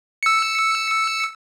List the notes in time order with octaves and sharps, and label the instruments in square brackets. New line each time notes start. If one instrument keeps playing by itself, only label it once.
[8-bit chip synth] E6 C#7